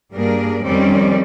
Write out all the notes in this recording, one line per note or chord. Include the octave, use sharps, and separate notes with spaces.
G2 G3 A#3 D4 G#4 A#4
F2 D#3 G3 C4 C#4 D5